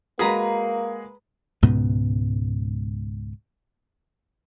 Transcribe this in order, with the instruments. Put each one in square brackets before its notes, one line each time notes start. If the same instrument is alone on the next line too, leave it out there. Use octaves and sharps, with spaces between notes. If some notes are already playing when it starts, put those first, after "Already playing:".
[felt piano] G#3 F#4 G#4 [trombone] A#3 [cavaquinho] B4 A#5 B5
[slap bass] C#2 G#2 B2 B3